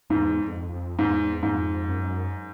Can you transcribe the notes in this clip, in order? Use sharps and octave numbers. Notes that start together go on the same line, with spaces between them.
E2 G#2
F2
F2
E2 G#2
F2 G#2
F#2